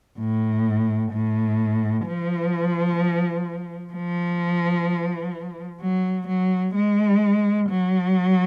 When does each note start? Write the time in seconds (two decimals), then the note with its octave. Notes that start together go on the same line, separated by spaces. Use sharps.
0.19 A2
1.12 A2
2.07 F3
3.94 F3
5.81 F#3
6.28 F#3
6.75 G#3
7.70 F#3